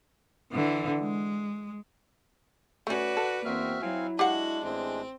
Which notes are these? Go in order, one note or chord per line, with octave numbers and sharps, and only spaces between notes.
D3 E3
G#3
A3 C#4 F#4 B4 D5
A4 F#5
E2 A#3 C4 F#4 E5 F6
F#3 C4 E4 F5 G#5
G#3 D4 F#4 G4 F5 F#5
A1 E3 C4 G#4